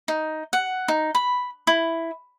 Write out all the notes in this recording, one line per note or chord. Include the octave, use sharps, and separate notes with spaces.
D#4
F#5
D#4
B5
E4